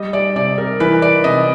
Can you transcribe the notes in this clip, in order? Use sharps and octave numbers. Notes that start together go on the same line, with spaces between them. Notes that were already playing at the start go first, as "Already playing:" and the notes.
Already playing: G3 D#5
D5
C3 D5
A#4
E3 B4
D5
C3 D#5